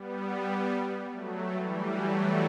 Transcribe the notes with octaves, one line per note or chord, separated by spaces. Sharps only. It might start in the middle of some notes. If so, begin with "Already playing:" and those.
Already playing: G3 B3
F#3 A3
E3 G3
F#3 A3